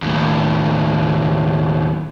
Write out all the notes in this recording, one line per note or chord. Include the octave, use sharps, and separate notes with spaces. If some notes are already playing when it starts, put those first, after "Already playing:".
D#2 A2